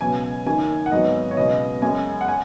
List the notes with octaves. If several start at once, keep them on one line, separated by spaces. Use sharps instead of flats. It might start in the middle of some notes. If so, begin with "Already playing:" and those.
C#2 B2 F#3 B3 G#5
F#1 F#2 D#3 G#5
F#5
G#1 G#2 F#3 B3 D#5
C#5
C#2 B2 F#3 B3 D#5
F#2 C#3 G#3 G#5
F#5
G#5